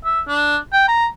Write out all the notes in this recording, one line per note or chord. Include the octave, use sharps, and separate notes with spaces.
E5
D4
G5
A#5